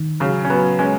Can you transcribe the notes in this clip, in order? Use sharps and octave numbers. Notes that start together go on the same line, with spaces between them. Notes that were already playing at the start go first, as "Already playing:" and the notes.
Already playing: D#3
C#3 F#3
C#4
F#3 B3
G#3 C#4